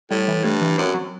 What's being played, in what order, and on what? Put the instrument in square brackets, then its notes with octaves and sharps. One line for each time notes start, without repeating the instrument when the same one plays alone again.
[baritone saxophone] A2 [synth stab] G3
[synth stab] E3
[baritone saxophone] G2 [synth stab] A3
[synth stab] E3
[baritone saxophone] F#2 [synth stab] C4
[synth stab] F#3